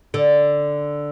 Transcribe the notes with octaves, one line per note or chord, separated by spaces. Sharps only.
D3